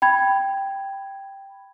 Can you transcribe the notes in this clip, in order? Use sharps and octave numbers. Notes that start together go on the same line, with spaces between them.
G5 B5 G#6